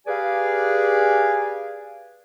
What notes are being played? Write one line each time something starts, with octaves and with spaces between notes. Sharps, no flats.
G4 G#4 B4 D5 F5 G#5